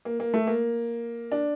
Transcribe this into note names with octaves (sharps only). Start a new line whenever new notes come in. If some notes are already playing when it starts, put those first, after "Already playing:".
A#3
A#3
A3
A#3
D4